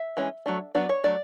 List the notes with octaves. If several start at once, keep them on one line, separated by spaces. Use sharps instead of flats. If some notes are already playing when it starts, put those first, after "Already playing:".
Already playing: E5
E3 G#3 C#4
F#3 A3 D4
F#3 B3 D4 D5
C#5
F#3 A3 D4 D5